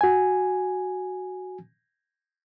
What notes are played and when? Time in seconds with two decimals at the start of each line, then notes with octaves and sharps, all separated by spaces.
0.01 F#4 G#5